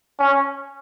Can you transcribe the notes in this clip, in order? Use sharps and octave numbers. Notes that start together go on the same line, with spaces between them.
C#4